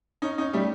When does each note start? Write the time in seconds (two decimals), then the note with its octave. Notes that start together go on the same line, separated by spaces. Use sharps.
0.22 C#4 D#4
0.38 C#4 D#4
0.53 G3 A3